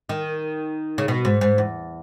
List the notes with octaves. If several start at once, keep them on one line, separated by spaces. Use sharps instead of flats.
D#3
C#3
B2
G#2
G#2
E2